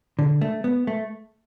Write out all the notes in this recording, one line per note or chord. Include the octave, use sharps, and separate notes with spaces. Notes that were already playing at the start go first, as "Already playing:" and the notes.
D3
A3
B3
A3